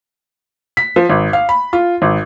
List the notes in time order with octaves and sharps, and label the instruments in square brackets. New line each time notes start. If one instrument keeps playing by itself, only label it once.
[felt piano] B6
F3
G#1
F5
B5
F4
G#1